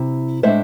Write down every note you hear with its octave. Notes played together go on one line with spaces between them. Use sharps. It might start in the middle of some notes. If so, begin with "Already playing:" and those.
Already playing: C3 E4
A2 G#3 D4 C5 E5